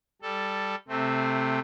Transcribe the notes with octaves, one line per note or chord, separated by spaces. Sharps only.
G3 A4
C3 A3 C4